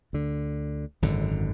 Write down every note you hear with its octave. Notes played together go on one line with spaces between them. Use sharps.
D2 D3
G#1 F#2 D3